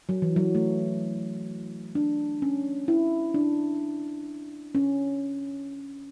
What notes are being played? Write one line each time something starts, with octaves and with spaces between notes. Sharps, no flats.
F#3
E3
F#3
A3
D4
C#4
E4
D4
C#4